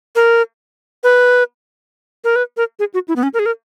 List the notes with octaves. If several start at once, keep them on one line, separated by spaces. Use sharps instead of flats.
A#4
B4
A#4
B4
A#4
G#4
F#4
E4
B3
C#4
A#4
G#4
A#4